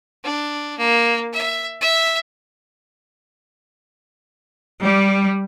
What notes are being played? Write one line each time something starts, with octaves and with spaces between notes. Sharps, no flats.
D4
A#3
E5
E5
G3